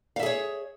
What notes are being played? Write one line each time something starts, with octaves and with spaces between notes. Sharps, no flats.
G#4 C#5 E5 F5